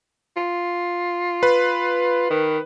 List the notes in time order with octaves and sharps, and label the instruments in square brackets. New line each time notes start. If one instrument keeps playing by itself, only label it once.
[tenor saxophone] F4
[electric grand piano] B4
[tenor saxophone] D#3